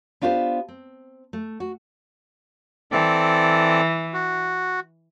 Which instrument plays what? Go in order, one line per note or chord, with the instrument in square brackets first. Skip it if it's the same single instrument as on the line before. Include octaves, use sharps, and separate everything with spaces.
[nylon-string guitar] B3 D4 F4 G4 B4 C5
C4
A3
F#4
[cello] E3 [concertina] C4 A4 D5
[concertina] F#4